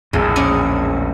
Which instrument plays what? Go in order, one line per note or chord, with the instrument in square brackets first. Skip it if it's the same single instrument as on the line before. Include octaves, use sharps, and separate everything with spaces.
[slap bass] A#1 E2 A2 [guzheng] G#3
[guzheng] C#4 D5 D#5